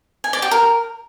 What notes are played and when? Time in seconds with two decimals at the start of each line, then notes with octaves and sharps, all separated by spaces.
0.24 G#5
0.33 D5
0.42 G4
0.51 A#4